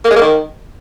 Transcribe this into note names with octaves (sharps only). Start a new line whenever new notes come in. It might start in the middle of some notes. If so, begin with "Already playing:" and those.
A#3
G#3
A#3
D#3